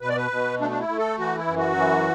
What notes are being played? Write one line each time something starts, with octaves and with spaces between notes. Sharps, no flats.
B2 B4
D5
B4
B2
A3 D4
D4
E4
A3
A4
E3 F#4
E4
F#2
F#4
E3